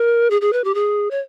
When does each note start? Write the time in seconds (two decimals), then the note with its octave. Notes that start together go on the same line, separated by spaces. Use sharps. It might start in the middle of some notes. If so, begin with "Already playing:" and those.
Already playing: A#4
0.30 G#4
0.41 G#4
0.53 B4
0.64 G4
0.74 G#4
1.11 C#5